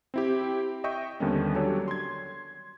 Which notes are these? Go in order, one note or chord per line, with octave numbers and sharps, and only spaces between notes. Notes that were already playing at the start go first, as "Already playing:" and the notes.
C4 E4 G4
D#5 E5 G5 C#6 G6
D#2 D3 D#3 G3 B3 C#4
F#3 G3 D4 G4 A4 C#5
C6 G#6